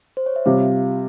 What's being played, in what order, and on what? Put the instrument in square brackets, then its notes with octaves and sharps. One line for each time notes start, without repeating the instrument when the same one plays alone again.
[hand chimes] C5
C#5
E5
[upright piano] C3 G3 [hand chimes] F4 F5